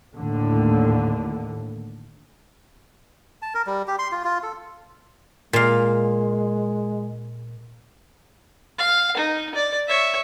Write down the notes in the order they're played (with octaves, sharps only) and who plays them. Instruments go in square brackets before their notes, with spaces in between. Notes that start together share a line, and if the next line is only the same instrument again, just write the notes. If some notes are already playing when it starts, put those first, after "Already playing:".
[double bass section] D#2 A2 D3
[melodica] A5
A#4
G3
G4
C6
F4
F4
A4
[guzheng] A#2 F5 [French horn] G#3
[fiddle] F5
D#4
D5
C#5 E5